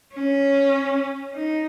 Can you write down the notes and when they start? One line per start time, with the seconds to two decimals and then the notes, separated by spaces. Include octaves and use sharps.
0.15 C#4
1.35 D#4